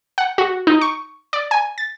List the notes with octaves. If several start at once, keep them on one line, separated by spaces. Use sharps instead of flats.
F#5
F#4
D#4
C#6
D5
G#5
A6